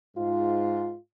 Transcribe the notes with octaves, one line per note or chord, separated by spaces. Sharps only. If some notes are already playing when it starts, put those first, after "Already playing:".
G#2 F4